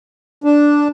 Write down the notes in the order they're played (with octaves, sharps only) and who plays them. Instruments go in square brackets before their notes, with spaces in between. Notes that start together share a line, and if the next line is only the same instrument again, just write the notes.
[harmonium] D4